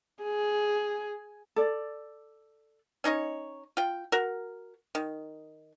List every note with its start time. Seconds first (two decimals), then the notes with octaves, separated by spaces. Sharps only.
0.23 G#4
1.56 A4 D5
3.04 C#4 D#4 C#5 D#5
3.77 F4 G5
4.12 F#4 A#4
4.95 D#3